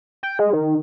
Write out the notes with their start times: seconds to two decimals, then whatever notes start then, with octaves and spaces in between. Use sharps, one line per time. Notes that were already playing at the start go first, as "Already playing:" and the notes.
0.23 G5
0.39 G#3
0.53 D#3